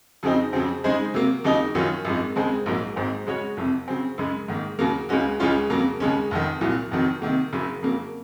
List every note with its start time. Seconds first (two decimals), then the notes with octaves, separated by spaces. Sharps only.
0.23 F2 C#3 F#3 C4 D#4
0.53 F2 C#3 F#3 C4
0.84 C#3 G#3 D#4 G#4 C5
1.14 C3 F#3 A#3
1.44 D#2 C#3 F#3 A#3 D#4
1.75 F#2 D#3 F#3 C#4 F4
2.05 G#1 F#2 F3 G#3
2.36 D#2 C#3 G#3 C4
2.66 A#1 G#2 F#3 A#3
2.96 G#1 G#2 F#3 C4
3.27 C#3 G#3 C#4 F#4 C#5
3.57 F#1 F2 C3
3.88 C#3 F#3 C4
4.18 F#2 C#3 G#3
4.48 G#2 D#3 A#3
4.79 D#2 C#3 F#3 A#3
5.09 C#2 C#3 G#3 C#4 F#4
5.40 C#2 C#3 G#3 C#4 F4
5.70 F2 C#3 F#3 A#3
6.00 D#2 C#3 G#3 C#4
6.31 F1 F2 D#3
6.61 C2 A#2 F#3
6.91 F1 F2 D#3 F#3
7.22 C3 D#3 A#3
7.53 F#1 F#2 C#3 F#3
7.83 F2 C#3 F#3 A#3